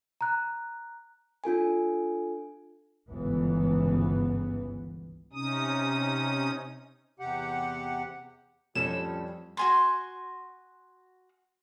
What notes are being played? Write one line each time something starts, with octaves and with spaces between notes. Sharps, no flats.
A#5 F#6
D4 F4 A4 G#5
G1 C#2 G#2 E3 B3
C3 C#4 D#4 D#6
E2 C3 G4 F#5
F2 A2 F3 G3 C#4 A4 E7
F#4 G#5 C6